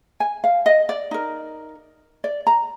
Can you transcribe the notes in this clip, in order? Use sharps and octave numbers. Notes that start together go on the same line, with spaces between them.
G#5
F5
D#5
D5
D#4 A#4
D5
A#5